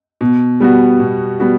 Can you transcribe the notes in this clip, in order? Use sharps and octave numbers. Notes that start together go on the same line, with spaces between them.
B2
G3 B3 F#4
B2
G3 B3 F#4